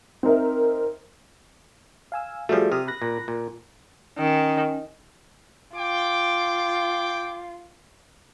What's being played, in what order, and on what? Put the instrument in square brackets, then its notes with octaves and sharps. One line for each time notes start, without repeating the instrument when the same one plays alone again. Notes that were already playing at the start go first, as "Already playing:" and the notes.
[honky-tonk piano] C4 D#4 A#4 E5
[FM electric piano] F5 G#5 E6
[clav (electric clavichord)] F3 G3 A3 [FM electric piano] F#4 G#4
[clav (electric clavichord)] C3 [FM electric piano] G4 D#6 F6
[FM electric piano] B5 F#6 A#6
[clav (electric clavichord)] A#2
A#2
[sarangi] D#3 [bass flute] C#4
[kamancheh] F4 [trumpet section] G5 D6